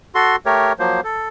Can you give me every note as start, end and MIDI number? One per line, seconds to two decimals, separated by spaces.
0.15 0.36 66
0.15 0.36 69
0.15 0.36 84
0.46 0.73 57
0.46 0.73 67
0.46 0.73 70
0.46 0.73 73
0.79 1.01 53
0.79 1.01 54
0.79 1.01 58
0.79 1.01 72
1.04 1.29 69